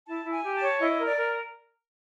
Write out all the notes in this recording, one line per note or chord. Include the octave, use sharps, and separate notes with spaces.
E4 A5
E4
G#5
G4
A5
C#5
E4 D#5
A#4
D5
A#4